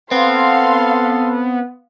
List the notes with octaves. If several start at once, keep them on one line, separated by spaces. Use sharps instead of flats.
B3 C4 A4 F5 C6